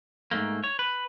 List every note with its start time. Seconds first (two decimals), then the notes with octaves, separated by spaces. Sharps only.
0.31 G#2 B2 A3 A#3
0.64 C#5
0.79 B4